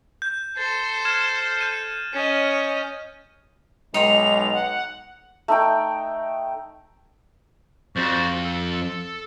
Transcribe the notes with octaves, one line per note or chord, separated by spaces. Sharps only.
G6
A4 C5 A6
F6 G#6 E7
G6 D#7
C#4 D#5
B1 G#3 D#4 G5 C6 F7
F#5
A3 D#4 G5
F2 F#4 C5 D5
A4